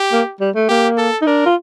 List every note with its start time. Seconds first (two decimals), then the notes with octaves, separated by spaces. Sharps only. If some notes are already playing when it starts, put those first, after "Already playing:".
Already playing: G4
0.12 A#3
0.40 G3
0.55 A3
0.69 A#3 G4
0.98 A4
1.22 D#4
1.26 D4 A#4
1.45 F4